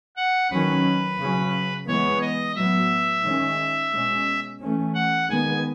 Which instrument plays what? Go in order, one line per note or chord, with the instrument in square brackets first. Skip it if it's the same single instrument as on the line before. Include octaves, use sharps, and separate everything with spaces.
[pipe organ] F#5
[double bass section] D#3 F#3 C#4 [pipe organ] B4
[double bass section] C#3 F#3 C#4
[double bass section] E3 G#3 B3 [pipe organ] C#5
[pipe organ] D#5
[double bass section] A2 F#3 B3 [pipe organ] E5
[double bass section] D#3 G#3 C#4
B2 G#3 C#4
E3 A3 C#4
[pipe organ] F#5
[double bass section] D#3 G#3 B3 [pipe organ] G#5